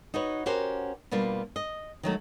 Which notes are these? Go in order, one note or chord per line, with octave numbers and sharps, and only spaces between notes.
D#4 F#4 B4 C#5
C#4 F#4 G4 A#4 C5
B2 G3 A#3 D4 F4
D#5
D#3 F#3 A3